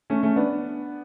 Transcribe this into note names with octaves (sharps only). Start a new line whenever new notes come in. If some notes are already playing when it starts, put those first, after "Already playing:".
A3 C#4
A3 C#4
B3 D4